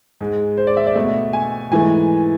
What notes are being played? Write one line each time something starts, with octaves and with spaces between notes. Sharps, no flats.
G#2 G#3
C5
D5
E5
D5
B2 A3 E5
G#5
G#2 E3 A3 G#5